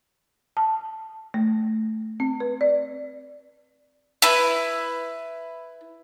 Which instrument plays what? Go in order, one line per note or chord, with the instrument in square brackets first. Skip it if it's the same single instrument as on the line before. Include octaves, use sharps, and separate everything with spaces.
[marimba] A5
A3
C4
B4
D5
[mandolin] E4 B4